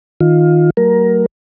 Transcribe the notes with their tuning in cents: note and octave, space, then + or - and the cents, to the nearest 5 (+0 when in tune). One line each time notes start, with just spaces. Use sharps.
D#3 +10 F4 +15
F#3 +10 A3 +35 A#4 +15